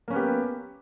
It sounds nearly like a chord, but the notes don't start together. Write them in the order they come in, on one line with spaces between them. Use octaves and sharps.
A#3 C#4 B3 G4